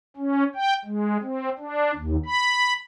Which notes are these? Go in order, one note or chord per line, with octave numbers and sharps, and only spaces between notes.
C#4
G5
G#3
C4
D4
D#2
B5